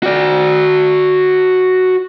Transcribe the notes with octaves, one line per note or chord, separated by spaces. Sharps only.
F#4 D5